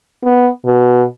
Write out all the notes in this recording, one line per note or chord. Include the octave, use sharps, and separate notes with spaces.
B3
B2